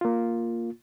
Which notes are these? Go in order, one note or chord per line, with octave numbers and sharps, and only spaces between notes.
A#3 F4